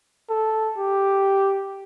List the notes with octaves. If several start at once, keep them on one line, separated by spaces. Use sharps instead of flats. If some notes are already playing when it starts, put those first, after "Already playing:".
A4
G4